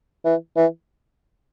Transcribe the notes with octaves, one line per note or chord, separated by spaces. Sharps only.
E3
E3